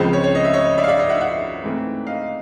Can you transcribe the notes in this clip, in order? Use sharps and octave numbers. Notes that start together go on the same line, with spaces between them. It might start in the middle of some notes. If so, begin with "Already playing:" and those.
Already playing: C#2 C#3 F3 G#3 C4 C5
C#5
C#5
D#5
E5
C#5 D#5
D5 E5
F5
D5 E5
D#5 F5
E5 F#5
E5 F#5
G#2 E3 A3 C4
D#5 F5